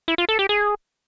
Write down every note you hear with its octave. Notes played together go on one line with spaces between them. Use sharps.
E4
F4
A4
G4
G#4